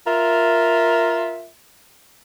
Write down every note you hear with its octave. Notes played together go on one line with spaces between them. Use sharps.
F4 A#4 E5